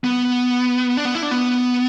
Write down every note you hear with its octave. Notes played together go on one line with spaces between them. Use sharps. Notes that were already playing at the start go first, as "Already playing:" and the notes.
B3
D4
B3
E4
D4
B3